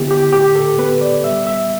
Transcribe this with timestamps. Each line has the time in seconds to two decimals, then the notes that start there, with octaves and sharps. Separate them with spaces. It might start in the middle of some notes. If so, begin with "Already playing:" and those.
Already playing: D3 B3 E4 G4 G5
0.11 G4
0.33 A2 G4
0.55 A4
0.78 B3 B4
1.01 D5
1.24 G3 E5
1.47 E5